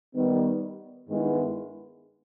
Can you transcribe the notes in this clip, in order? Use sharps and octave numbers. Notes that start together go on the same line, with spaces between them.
D#3 G3 B3
G2 D#3 G#3 B3 E4